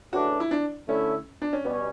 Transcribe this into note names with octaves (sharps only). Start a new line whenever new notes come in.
C#3 E3 A3 D4 F#4
E4
D4
D3 A3 C#4 E4
D4
C#4
B2 G3 B3 C#4